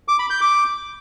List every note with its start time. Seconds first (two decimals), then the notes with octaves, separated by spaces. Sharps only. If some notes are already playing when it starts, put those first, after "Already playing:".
0.08 D6
0.19 B5
0.30 G6
0.41 D6